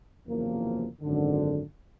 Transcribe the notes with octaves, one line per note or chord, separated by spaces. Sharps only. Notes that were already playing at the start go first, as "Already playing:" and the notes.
F#1 E2 C3 F3 A#3
G#1 F#2 D3